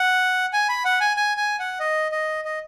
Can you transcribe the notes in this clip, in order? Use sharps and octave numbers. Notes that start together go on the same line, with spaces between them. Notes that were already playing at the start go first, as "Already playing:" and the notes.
Already playing: F#5
G#5
B5
F#5
G#5
G#5
G#5
F#5
D#5
D#5
D#5